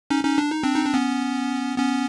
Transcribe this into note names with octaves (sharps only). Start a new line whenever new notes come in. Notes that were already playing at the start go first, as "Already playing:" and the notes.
C#4 D#4
C#4 D#4
D4
D#4
C4 D4
D#4
D4
B3 C#4
B3 C#4